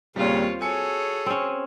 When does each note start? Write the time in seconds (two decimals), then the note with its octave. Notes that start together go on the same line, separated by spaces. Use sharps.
0.16 D#2 A#2 C#3 G3 C4 F4 C#5
0.61 F#4 G#4 A4 C#5 G#5 C#7
1.26 C4 C#4